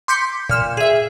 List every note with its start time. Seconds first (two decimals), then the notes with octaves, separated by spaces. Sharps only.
0.08 C6 D6 G6 B6 C#7
0.49 A#2 F6 E7
0.77 G#4 E5